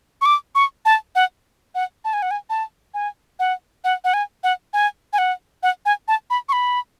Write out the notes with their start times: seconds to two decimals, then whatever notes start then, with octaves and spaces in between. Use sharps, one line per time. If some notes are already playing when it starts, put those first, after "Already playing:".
0.21 C#6
0.26 D6
0.55 C#6
0.85 A5
1.15 F#5
1.75 F#5
2.05 A5
2.13 G#5
2.22 F#5
2.31 G#5
2.50 A5
2.94 G#5
3.39 F#5
3.84 F#5
4.04 F#5
4.14 G#5
4.44 F#5
4.73 G#5
5.13 G#5
5.18 F#5
5.63 F#5
5.86 G#5
6.08 A5
6.30 B5
6.49 C#6
6.53 B5